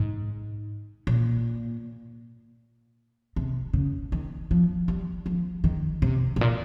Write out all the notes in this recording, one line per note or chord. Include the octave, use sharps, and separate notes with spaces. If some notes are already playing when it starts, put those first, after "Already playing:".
Already playing: G#2
A#2
C3
C#3
D#3
F3
G3
F3
D#3
C3
G#2
A#2